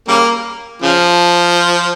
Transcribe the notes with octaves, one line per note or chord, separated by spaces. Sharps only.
C#3 G3 A#3
C#3 F3